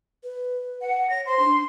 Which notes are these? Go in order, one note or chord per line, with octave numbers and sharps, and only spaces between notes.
B4
F#5
C#5 A#6
C5 C6
D4